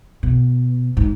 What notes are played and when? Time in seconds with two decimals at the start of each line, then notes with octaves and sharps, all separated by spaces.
0.23 B2
0.97 G#2